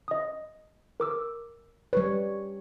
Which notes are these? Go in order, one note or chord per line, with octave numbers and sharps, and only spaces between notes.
D#5 D#6
A#4 D6 E6
G3 B4 C#5